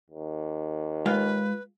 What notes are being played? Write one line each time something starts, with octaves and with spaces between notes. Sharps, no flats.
D#2
G#3 F4 B4 F5